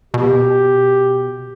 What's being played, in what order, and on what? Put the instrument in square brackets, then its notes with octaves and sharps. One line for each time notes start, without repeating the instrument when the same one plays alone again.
[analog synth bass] B2 [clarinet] G4